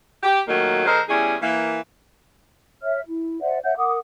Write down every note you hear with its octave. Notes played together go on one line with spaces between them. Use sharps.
G4
A#2 D#3 F#3 A3 A#3
D3 G#3 A#4 C5
E2 G3 C#4 E4 G#4
E3 A#3
C#5 E5 F6
E4
C5 D5 E5 F#5
C#5 E5 F#5 G6
A#4 F#5 D6 D#6